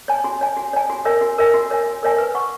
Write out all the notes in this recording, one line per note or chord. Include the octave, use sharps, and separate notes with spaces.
C#5 G#5
F#4
C#5 G#5
F#4
C#5 G#5
F#4
A#4 C#5 E5 G#5
F#4
A#4 C#5 E5 G#5
F#4
A#4 C#5 E5 G#5
F#4
A#4 C#5 E5 G#5
B4
F#5 C#6